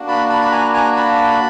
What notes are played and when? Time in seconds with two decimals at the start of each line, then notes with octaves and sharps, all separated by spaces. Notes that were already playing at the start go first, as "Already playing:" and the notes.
Already playing: A#3 D4 F#4
0.08 A5 B5
0.29 A5 B5
0.42 B5
0.52 G#5 A#5
0.74 G#5 A#5
0.96 A5 B5